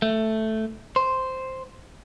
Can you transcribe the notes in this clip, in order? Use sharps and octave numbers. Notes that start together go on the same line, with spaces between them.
A3
C5